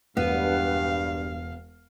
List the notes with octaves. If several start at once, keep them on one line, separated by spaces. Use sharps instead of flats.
E1 G2 B3 F5